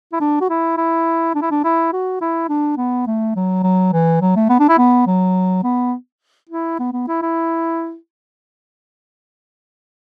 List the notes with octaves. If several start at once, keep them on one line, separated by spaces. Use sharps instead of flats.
E4
D4
F#4
E4
E4
D4
E4
D4
E4
F#4
E4
D4
B3
A3
F#3
F#3
E3
F#3
A3
B3
D4
E4
B3
F#3
B3
E4
B3
B3
E4
E4